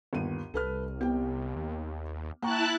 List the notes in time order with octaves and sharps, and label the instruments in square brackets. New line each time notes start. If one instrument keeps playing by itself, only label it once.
[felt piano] G1 D#2 D#7
[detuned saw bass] C2 [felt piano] A4 B4 F6
[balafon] B3 [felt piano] G4 G5
[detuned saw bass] D#2
[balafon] A#3 [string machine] E4 A5 F#6 [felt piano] G5 A#5 C#6